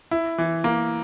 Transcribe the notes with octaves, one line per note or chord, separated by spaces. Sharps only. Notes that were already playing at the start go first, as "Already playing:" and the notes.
E4
E3
A#3